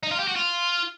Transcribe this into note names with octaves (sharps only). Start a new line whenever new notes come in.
D#4
F4
G4
F#4
F4